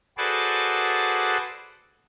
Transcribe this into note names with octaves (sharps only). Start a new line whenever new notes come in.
F#4 G#4 A4 B4 C5 D5